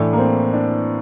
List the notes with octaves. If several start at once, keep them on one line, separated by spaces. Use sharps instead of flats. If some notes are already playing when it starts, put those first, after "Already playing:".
Already playing: A2 E3 D4
A#3
C4
D4